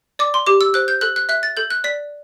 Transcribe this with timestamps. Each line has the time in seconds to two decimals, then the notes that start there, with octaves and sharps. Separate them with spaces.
0.19 D5 D6
0.34 C6
0.47 G4 D6
0.61 E6
0.74 C5 F#6
0.88 G6
1.01 A4 F#6
1.16 F#6
1.29 E5 F#6
1.43 A6
1.57 A4 G6
1.71 F#6
1.84 D5 B6